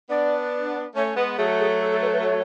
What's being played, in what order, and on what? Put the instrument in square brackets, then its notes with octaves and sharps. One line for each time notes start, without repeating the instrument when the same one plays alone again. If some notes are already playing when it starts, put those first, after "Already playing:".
[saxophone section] B3 D4 [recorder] D5
[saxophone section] A3 C#4 [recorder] C#5
[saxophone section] G#3 B3 [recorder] B4
[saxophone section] F#3 A3 [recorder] G#4
[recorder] G#4
A4
A4
B4
B4
C#5